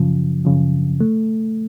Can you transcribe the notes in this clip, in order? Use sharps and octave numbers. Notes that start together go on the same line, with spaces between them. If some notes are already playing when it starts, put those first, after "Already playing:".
Already playing: F#2 C#3 F3
F#2 C#3 F3
A3